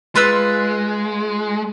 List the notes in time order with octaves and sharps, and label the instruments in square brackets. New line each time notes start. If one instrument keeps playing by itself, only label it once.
[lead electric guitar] G#3 [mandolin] F4 B4 E6